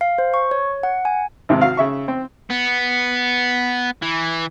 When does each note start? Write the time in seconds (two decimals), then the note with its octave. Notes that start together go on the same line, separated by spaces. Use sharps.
0.01 F5
0.18 C5
0.34 C#6
0.51 C#5
0.83 F#5
1.05 G#5
1.49 G#1 G#2 C3 D#3 C4
1.62 F#4 F5
1.77 C#3 E5 C#6
2.08 C4
2.50 B3
4.02 E3